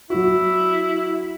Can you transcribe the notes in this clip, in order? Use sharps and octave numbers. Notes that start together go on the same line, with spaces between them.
F#3 E4 F#4